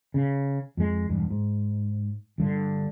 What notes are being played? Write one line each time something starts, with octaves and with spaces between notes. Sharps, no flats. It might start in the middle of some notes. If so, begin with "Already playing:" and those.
C#3
F2 G#3
E1 G2
G#2
G1 G2 D3